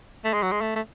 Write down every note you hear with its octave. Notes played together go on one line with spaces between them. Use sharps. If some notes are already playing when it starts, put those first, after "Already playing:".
A3
G#3
F#3
G#3
A3
A3